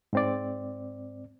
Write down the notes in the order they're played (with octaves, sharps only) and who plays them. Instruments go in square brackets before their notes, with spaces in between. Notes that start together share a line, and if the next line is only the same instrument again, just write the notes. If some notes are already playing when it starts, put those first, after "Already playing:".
[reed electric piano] G#2 C4 D5